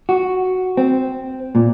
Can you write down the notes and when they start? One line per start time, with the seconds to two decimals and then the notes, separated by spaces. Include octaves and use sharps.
0.09 F#4
0.77 C4
1.55 A#2